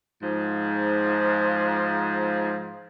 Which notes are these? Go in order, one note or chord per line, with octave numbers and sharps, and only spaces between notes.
G#2 F3